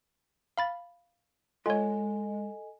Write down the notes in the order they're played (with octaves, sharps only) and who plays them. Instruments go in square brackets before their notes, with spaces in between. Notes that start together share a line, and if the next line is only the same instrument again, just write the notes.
[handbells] F5 B5 A6
[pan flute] G#3 [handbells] F4 C#5 [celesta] A4 D#5 G#5